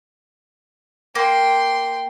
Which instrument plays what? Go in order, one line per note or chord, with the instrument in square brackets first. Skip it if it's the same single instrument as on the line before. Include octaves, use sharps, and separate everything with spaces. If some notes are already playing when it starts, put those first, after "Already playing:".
[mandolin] A#3 [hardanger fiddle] G5 C6